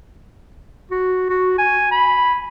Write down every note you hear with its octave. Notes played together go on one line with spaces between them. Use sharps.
F#4
F#4
G#5
B5